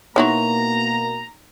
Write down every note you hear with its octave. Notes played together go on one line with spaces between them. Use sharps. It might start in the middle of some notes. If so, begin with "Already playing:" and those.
B2 A#3 B3 D#4 E4 F#4 C#5 A#5